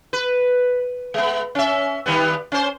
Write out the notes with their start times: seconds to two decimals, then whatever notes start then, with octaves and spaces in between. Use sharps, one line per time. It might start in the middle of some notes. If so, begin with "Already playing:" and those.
0.13 B4
1.14 G#3 B3
1.55 C#4 E5
2.06 D#3 G3 B3
2.52 C#4 C5